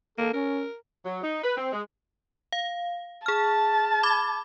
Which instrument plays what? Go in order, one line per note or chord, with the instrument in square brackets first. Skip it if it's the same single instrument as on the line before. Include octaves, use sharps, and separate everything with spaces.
[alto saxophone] A#3 [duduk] A4
[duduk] C#4 [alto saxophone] A#4
[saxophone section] F#3
D#4
B4
C4
G#3
[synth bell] F5
[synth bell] G#4 F6 [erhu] A5
[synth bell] B5 D6 G#6